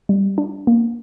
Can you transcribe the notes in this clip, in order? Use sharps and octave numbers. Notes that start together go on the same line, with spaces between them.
G3
D4
A#3